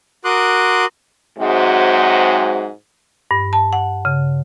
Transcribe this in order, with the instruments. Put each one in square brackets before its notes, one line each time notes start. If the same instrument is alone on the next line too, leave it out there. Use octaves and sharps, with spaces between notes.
[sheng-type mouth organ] F#4 A#4 C6 D6 D#6 F#6
[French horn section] G#2 C3 F#3 G#3 C4 F#4
[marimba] G2
A5
F#5
C#3